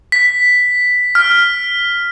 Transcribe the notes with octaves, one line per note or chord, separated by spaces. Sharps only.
B6
F6